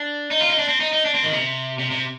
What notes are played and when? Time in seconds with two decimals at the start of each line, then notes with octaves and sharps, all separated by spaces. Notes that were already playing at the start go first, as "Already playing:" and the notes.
Already playing: D4
0.31 D#4
0.40 F4
0.50 D#4
0.59 D4
0.68 C4
0.80 D#4
0.93 D#4
1.05 D4
1.15 C4
1.24 D#3
1.33 C3
1.79 C3
1.91 C3